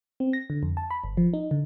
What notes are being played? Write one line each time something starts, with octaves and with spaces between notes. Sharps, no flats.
C4
A#6
D3
F2
A5
B5
G1
F3
D#4
D3